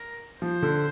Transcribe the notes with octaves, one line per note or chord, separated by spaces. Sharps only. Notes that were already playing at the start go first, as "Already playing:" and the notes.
Already playing: A#4
F3 C5
D3